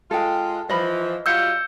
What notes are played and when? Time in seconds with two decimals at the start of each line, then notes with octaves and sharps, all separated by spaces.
0.11 G#3 F4 A4 G5
0.69 E3 F3 D#5 B5
1.26 G3 F4 F#4 E6 G6 C#7